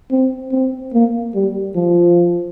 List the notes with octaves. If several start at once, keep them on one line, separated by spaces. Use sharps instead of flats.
C4
C4
A#3
G3
F3